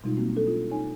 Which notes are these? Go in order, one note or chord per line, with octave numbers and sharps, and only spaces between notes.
B2 G3 G#3 D#4 F4
B2 F#3 A#3 C4 F#4
D4 A4
C#4 F4
D#4 C#5 G#5